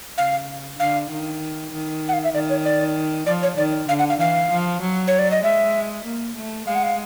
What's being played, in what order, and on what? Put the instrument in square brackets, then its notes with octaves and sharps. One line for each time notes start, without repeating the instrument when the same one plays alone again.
[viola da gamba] C#3 [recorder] F5
[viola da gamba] D3 [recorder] F5
[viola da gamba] D#3
D#3
[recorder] F#5
F5
E5
[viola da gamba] D#3 [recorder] D5
[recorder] C#5
D5
[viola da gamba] F3 [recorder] D5
[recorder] C#5
[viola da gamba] D#3 [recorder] D5
[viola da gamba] D3 [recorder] F5
[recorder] F#5
F5
[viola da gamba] E3 [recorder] F5
[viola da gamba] F3
F#3
[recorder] C#5
D5
D#5
[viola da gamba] G#3 [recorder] E5
[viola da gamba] A#3
A3
[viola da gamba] G#3 [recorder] F5
[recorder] F#5
F5